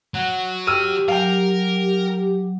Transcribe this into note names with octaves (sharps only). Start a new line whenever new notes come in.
F#3 F#5
G4 E6 F6 D#7
F#3 A#4 F5 G5